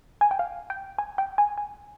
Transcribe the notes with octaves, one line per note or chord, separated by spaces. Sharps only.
G#5
G5
F5
G5
G#5
G5
G#5
G#5